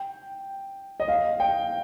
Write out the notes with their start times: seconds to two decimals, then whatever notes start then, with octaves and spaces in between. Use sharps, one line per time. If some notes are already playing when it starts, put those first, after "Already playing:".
Already playing: G5
1.00 D#5
1.08 F5
1.40 G5